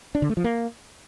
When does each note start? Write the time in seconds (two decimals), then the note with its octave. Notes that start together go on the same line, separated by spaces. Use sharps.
0.15 D4
0.22 D3
0.30 A3
0.37 F3
0.44 A#3